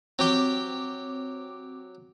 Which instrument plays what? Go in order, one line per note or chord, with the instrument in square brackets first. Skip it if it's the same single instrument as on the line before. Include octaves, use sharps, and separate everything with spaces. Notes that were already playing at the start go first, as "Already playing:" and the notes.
[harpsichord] F#3 G4 G5 [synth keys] C4 D6